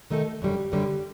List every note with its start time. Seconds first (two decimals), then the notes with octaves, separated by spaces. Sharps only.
0.10 D#3 A3 D#4 A4
0.42 F#2 D3 G3
0.72 F#2 D3 G3